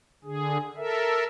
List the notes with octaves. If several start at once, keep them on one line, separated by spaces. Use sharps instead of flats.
D3 G#4
A4 A#4 E5